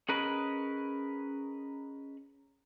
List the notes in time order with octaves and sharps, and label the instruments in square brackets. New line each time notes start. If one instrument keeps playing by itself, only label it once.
[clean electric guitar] C#4 G#4 A#4 B4 D#5 B5